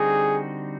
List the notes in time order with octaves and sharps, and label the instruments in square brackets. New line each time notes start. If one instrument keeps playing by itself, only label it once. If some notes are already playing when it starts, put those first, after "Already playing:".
Already playing: [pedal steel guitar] D3 G3 C4 D#4 F#4 [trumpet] G#4